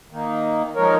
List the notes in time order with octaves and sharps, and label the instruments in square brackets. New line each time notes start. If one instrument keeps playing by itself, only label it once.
[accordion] D#3 A#3 D#4
F3 G#3 D#4 A#4 C#5